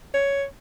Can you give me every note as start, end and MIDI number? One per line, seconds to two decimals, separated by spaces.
0.14 0.45 73